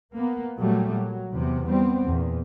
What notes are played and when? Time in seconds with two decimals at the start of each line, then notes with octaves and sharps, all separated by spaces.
0.14 A#3 B3
0.58 A#2 F#3 G3 A3
0.92 F#3
1.33 E2 C3
1.67 G3 B3 C4
2.06 E2 A#2